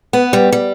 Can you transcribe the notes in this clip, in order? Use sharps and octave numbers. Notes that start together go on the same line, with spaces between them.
B3
G3
G3